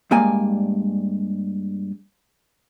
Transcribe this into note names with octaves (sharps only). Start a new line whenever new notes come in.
G2 G#3 A#3 D5 G#5